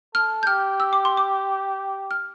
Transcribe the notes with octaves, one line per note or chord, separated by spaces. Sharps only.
A4 F6
G6
G4 F6
E6
D6
C6
D6
F6